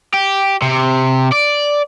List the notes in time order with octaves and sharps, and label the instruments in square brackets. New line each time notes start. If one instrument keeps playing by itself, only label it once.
[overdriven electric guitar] G4
C3
D5